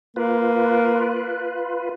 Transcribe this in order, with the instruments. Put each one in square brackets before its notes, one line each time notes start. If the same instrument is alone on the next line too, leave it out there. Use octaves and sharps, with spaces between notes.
[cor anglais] A#3 [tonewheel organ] F4 B4